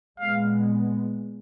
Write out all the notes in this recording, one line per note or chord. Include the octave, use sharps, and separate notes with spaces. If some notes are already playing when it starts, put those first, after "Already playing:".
A#2 G#3 B3 F5